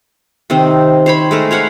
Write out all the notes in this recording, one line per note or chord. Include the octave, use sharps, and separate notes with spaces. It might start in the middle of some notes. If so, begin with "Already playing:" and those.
C3 D#3 C4 D#4
C5 C#5 B5
G#3 A3 A#4
C#5 F5 F#5 B5